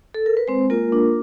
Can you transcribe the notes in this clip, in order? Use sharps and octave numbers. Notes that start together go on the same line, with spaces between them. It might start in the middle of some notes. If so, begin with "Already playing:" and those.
A4
A#4
B4
G#3 C4 C5
A#3 F4 A#4
D4